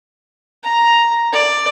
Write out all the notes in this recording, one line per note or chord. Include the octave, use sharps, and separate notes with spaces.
A#5
D5